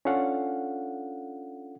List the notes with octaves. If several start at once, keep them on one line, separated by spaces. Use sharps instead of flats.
C#4 D4 F4 A4 F5 F#5